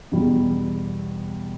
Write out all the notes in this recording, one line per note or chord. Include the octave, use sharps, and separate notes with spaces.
E2 B2 G3